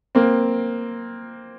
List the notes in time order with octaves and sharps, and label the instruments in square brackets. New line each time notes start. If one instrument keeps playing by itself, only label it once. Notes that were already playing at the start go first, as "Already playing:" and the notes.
[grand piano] A#3 C4